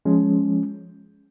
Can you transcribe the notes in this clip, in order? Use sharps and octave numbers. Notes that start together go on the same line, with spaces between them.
F3 G#3 C#4